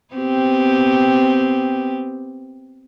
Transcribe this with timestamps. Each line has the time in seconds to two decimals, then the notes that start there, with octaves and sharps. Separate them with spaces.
0.14 B3 C4 G4